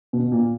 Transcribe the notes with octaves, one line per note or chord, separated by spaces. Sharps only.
B2
A#2